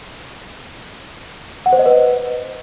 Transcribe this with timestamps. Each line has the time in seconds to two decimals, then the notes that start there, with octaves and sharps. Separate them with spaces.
1.66 F#5
1.72 C5
1.79 D#5
1.86 B4